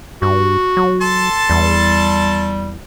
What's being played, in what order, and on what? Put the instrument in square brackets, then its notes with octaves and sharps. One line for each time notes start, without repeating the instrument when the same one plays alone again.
[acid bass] G2 [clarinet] F#4
[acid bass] F#3
[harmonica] A4 A5 C6
[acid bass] E2 [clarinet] G3